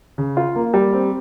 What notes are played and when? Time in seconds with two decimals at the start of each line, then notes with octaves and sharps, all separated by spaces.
0.18 C#3
0.37 F4
0.56 A#3
0.74 G3
0.93 C4